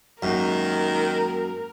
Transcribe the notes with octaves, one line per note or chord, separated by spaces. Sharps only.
F#2 D#3 F#3 G#3 A#3 A#4